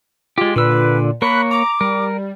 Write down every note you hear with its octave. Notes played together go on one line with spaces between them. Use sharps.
G#3 F4 G4
A#2 D3 F4 B4 E6
A#3 A#4 C#5 B5 F#6
A#5 D6
G3 A#4